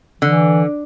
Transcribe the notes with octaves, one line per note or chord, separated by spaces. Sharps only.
D3 E3